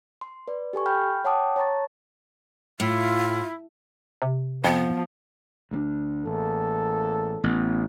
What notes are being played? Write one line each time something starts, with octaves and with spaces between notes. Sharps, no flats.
C6
B4 D5
G4 A4 G#5 C#6
G5 B5 F6 G6
C#5 F#5 G5 A5 D6 D#6
C#5 A5 A#5 C#6 A6
A2 E4 F4
C3
F2 F3 B3
D2 G3 D4
A1 E2 A#3 A4
A1 B3